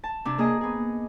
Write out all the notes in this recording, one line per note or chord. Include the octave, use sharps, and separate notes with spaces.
A5
C3 D4
A#3 G#4 D#5
B3 G#4